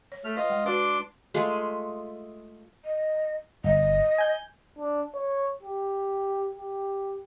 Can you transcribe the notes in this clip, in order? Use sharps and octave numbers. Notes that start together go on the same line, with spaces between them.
C#5
A3 F6
F4 B4 D#5 F5
G#3
D4 F#4 B4 C6 D6
G#3 A3 F4 G#4
D#5
G1 D#5
G#5 G6
D4
C#5
G4
G4